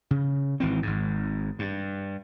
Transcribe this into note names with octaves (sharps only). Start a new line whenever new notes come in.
C#3
G#1 E3 C4
G#1 G#2
G2